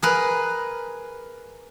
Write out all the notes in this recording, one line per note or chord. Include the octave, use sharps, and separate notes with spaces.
G#4 A#4 B4